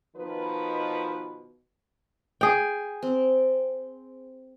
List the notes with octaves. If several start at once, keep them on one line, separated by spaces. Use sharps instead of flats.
B2 D#3 F3 B4
G#4 G5
C4